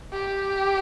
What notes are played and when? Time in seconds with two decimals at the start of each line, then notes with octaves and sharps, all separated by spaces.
0.13 G4